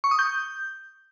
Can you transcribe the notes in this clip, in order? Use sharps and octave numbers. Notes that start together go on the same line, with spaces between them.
C#6
D#6
G6